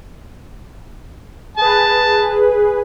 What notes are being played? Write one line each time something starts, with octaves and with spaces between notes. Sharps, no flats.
G#4 B4 A5